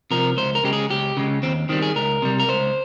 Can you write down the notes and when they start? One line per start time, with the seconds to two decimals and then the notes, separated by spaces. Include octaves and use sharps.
0.11 C3 F3 A#4
0.37 C#2 C5
0.55 A#4
0.64 C#3 G#3 G4
0.73 G#4
0.90 C#2 G4
1.17 C#3 G#3
1.43 D#2 C4
1.69 D#3 G3 C4
1.82 G#4
1.96 C#2 A#4
2.22 C3 G3
2.40 A#4
2.49 C#2 C5